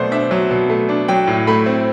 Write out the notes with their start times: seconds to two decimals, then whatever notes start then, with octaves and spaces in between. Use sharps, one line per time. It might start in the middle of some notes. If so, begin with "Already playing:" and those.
Already playing: B2 F#3 A3 C5 D5
0.11 D4 E5
0.31 F#3
0.51 B2
0.69 A3
0.89 D4
1.08 F#3 G5
1.28 A2
1.47 A3 B5
1.66 C4